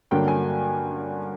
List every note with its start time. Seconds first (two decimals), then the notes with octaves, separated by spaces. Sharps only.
0.11 G2 D3 F#3 A#3 G5
0.28 G#5